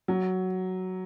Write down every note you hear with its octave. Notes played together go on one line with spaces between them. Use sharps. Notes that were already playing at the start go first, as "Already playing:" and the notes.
F#3